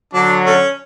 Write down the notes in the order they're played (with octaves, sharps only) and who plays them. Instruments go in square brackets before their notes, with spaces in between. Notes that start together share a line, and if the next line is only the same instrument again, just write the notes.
[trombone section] D3 F#3 [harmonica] D4
[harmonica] A3 C#4